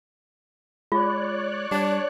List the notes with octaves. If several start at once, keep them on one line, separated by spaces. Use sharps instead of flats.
G#3 F4 C#5 D5 F#6
G3 D4